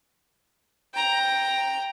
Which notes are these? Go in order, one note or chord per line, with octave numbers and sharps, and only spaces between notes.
G5 A#5